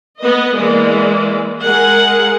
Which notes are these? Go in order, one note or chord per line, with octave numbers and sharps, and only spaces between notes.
B3 B4 D#5
E3 G#3 A#3 D5
G#3 G#4 A#4 F#5